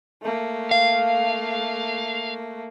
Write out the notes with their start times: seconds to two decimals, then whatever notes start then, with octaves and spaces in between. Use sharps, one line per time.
0.23 A3 A#3
0.71 F5